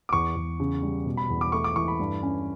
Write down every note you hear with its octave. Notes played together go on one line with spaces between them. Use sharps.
D6
E2 C#6
E2
C#3
G3
B2
B5
E2
D6
A3 C#6
D6
E3 C#6
B5
G2
C#4